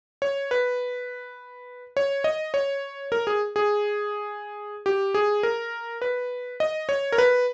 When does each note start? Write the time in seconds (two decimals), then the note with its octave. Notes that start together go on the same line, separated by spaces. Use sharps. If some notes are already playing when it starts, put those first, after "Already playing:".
0.22 C#5
0.51 B4
1.97 C#5
2.24 D#5
2.54 C#5
3.12 A#4
3.27 G#4
3.56 G#4
4.86 G4
5.14 G#4
5.43 A#4
6.02 B4
6.60 D#5
6.89 C#5
7.12 A#4
7.18 B4